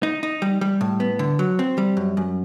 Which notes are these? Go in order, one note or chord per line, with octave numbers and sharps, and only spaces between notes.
D#4
D#4
G3
G3
A2
B3
D3
F#3
C4
G3
F#2
F#2